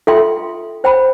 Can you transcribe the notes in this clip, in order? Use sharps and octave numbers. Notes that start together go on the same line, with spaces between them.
F4 A4 E5 G5 C6
C5 G5 B5